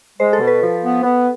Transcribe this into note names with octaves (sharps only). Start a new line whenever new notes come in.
G#3 C5
A4
B2
B4
F3
B3
B3